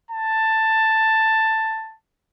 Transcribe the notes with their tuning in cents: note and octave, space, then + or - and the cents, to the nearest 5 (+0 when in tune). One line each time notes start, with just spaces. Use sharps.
A5 +10